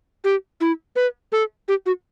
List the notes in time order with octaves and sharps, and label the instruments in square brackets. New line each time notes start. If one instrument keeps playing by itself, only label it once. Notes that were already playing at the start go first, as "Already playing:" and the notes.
[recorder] G4
E4
B4
A4
G4
F#4